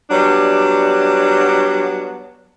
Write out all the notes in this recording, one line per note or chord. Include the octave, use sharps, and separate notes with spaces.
F#3 G3 B3 D4